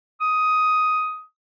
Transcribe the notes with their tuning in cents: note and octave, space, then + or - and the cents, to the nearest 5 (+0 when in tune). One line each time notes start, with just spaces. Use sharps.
D#6 +10